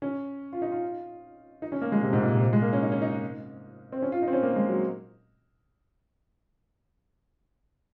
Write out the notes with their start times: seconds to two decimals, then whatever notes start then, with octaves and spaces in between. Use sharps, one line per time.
0.02 C#4
0.53 F4
0.62 D#4
0.72 F4
1.62 D#4
1.72 C#4
1.81 A#3
1.92 G#3
2.02 C3
2.13 G#2
2.22 A#2
2.33 C3
2.53 G#3
2.62 A#3
2.73 C#4
2.83 D#4
2.92 C#4
3.02 D#4
3.92 C4
4.02 C#4
4.12 F4
4.22 D#4
4.28 C4
4.33 C#4
4.43 A#3
4.56 G#3
4.69 F#3